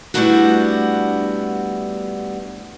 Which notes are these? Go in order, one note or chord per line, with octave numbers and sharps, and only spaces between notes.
G3 A3 B3 D4 E4 F#4